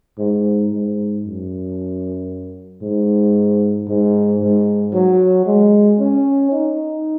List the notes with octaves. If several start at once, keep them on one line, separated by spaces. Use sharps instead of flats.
G#2
G#2
F#2
G#2
G#2
G#2
F#3
G#3
C#4
D#4